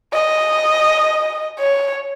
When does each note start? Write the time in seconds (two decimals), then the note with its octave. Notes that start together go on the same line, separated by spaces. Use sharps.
0.13 D#5
1.59 C#5